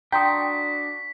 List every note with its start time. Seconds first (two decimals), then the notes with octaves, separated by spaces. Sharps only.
0.12 D4 F#4 G5 A#5 C6 D#6 B6